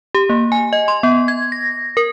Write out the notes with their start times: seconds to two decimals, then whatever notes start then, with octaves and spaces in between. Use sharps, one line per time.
0.15 G4
0.29 A#3
0.52 G#5
0.73 D#5
0.88 C6
1.03 B3
1.28 G#6
1.52 A#6
1.97 A#4